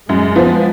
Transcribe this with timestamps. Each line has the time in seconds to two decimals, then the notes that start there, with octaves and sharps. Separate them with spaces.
0.09 F#2 G#3
0.36 F3 B3